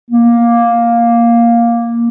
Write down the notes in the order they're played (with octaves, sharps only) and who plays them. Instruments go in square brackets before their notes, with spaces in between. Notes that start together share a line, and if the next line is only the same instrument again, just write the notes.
[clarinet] A#3